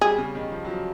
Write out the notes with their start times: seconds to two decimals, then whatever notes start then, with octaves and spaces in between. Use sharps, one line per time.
0.01 G3 G#4
0.18 C#3
0.35 D#3
0.52 F3
0.65 F#3
0.68 F3